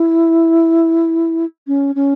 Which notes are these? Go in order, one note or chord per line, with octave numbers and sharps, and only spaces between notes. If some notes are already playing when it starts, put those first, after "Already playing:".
Already playing: E4
C#4
C#4